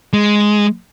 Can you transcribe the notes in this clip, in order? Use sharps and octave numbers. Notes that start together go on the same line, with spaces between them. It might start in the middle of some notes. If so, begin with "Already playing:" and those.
G#3